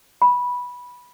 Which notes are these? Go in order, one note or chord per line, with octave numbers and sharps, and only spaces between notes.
B5